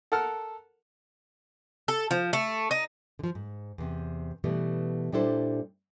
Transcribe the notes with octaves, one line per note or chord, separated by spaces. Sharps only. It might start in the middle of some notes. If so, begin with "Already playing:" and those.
A4 A#4 F#5 A5 F6
A4
F3
A3
D#4
D3 F3
G#2
E2 C3
B2 E3 G3 A3 B3
A#2 G3 D4 E4 A4 C5